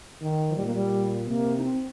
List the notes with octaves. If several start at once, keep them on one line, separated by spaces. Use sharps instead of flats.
D#3
F3
A#2 G3
A#3
G3
C3 A#3
D#4
C4